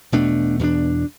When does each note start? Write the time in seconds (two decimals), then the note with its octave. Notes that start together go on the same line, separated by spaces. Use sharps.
0.12 E2 B2 A3 D4
0.59 E2 B2 A3 D4